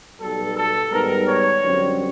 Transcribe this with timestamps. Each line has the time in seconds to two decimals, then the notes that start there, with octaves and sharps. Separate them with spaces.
0.20 B1 B2 G3 A4
0.56 A4
0.91 G#2 D#3 G3 B3 A#4
1.27 C#5
1.63 F#2 D3 G3 C4